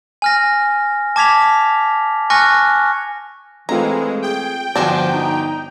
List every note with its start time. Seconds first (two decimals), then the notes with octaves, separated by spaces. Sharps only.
0.22 G#5 F6 A#6
1.16 A5 D6 G#6 B6 F7
2.30 G#5 C#6 F6 F#6 A#6 C#7
3.69 E3 G#3 A3 C4 F4 A#5
4.22 G#4 G5
4.76 G1 F3 D4 F#4 C5 G#5
5.12 D#4